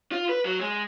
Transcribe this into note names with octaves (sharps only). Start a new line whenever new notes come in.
F4
B4
F#3
G#3